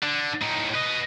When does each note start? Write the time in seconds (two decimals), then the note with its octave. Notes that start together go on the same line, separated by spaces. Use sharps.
0.03 D3
0.42 A2 D#4
0.74 B4 D#5